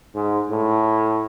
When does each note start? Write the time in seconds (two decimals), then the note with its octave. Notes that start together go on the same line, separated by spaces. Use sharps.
0.14 G#2
0.50 A2